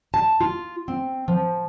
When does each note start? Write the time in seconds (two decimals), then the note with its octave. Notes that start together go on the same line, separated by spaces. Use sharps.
0.14 A5
0.41 F4
0.88 C4
1.28 F3